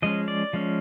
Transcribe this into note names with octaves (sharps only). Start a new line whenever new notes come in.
F3 G#3 C#4 D#5
D5
F3 G#3 C#4